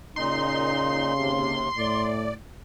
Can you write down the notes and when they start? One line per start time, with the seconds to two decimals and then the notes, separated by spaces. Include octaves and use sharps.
0.16 A#2 C#3 D#4 C6
1.16 D#2 C3
1.77 A2 D5